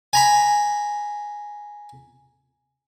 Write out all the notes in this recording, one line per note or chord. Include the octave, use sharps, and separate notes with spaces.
G#5 A#5 B5